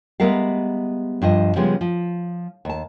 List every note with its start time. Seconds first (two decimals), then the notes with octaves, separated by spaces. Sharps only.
0.20 G3 G#3 B3 A#4 E5 F5
1.22 G2 F3 D#5
1.56 C#3 F3 G3 G#3 B3
1.81 F3
2.65 D#2 A5